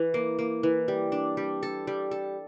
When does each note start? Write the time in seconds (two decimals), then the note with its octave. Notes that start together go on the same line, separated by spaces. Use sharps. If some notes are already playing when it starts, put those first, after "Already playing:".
Already playing: E3
0.14 A#3
0.39 A#3
0.63 E3
0.88 G3
1.12 D4
1.37 G3
1.63 A4
1.87 G3
2.11 A4